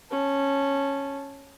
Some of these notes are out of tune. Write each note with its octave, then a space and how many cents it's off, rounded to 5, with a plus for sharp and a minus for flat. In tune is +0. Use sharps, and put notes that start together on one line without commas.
C#4 -10 A5 -15